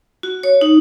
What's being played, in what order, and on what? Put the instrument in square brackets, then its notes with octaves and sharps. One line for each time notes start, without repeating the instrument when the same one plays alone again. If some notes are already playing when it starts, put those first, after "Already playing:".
[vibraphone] F#4
C#5
D#4